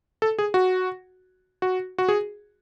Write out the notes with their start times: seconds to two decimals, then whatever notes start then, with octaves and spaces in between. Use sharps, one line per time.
0.22 A4
0.39 G#4
0.54 F#4
1.62 F#4
1.98 F#4
2.09 G#4